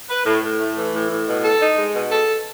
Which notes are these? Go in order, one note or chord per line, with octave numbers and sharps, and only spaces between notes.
B4
A2
A2
A3
E3
A2
A2
B2
A4
D#4
G#3
B2
A4